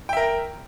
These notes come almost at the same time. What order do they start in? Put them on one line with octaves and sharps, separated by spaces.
G5 E5 A#4